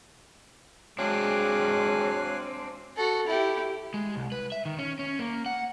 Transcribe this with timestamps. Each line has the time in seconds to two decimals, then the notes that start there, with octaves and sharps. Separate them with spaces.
0.99 F#3 G#3 C4 D4 F5 G#5 F#6
2.96 F#4 A4
3.27 E4 G4
3.94 G#3
4.16 C2
4.32 B4
4.52 E5
4.65 D#3
4.79 C#4
4.99 C#4
5.19 A#3
5.46 F#5